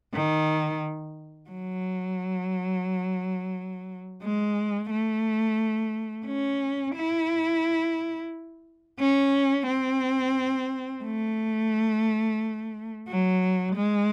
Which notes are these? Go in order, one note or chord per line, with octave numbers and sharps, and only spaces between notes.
D#3
F#3
G#3
A3
C#4
E4
C#4
C4
A3
F#3
G#3